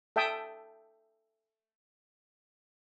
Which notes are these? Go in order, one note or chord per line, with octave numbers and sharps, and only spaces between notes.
A4 E5 G5 A5 D#6